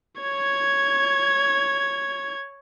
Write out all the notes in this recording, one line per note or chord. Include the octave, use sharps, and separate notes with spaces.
C#5 G#6